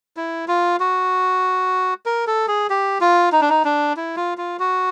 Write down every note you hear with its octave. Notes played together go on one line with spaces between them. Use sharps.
E4
F4
F#4
A#4
A4
G#4
G4
F4
D#4
D4
D#4
D4
E4
F4
F4
F#4